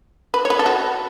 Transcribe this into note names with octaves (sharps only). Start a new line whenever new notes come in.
B4
C#5
B4
A4
F#4